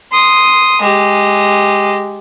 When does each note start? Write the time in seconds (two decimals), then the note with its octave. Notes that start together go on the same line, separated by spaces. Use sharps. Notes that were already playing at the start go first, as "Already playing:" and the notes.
0.12 C6 D#6
0.81 G#3 G4